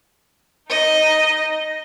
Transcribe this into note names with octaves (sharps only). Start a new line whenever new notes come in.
D#4 D#5